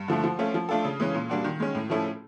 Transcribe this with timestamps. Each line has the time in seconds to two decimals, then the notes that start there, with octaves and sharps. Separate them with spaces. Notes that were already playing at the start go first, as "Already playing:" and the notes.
Already playing: G2
0.08 D3 F3 A3
0.24 F3
0.39 A3 C#4 F4
0.54 F3
0.69 A3 D4 F4 A4
0.85 C#3
1.00 E3 G#3 C#4
1.15 A#2
1.30 G3 A#3 D4 F#4
1.44 D#3
1.60 G#3 C#4
1.75 A2
1.90 F3 A3 C#4 E4